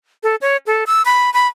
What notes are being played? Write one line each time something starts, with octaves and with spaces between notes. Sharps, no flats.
A4
C#5
A4
E6
B5
B5